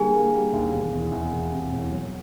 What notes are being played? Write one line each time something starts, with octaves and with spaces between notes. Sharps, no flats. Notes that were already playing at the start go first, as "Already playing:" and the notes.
Already playing: D3 G3 A#3 G#4 G#5
A#3
G3
D#2
E1
E2
E2
E1
C3
E1
F#3